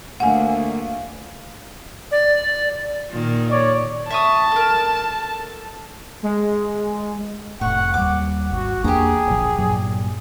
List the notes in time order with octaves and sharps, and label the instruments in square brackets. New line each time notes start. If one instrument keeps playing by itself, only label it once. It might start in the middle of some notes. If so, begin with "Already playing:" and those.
[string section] D2 [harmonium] A#3 [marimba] F#5 G#5
[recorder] D5
[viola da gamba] A#2 D#3
[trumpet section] C#5 D5
[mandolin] E5 C#6 D#6 [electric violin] A5
[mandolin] A4 A#4
[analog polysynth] G#3
[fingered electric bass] F1 A2 [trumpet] F#5 [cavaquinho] C#6
[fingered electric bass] D#2 G3 [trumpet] F#5 [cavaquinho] D6
[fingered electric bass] G#1 [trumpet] F#4
[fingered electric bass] E2 A#3 D4 [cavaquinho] G4 A#5 [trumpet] G#4
[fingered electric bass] D1 A#1 F3
G2 A#2 F#3